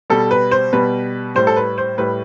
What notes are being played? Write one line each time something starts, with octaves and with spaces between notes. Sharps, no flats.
B2 G3 A4
B4
C5
B2 G3 B4
A2 G3 C5
A4
B4
C5
A2 G3 B4